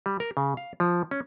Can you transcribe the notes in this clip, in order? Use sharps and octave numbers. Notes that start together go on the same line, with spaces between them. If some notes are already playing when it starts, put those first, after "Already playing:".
G3
A#4
C#3
F5
F3
C#4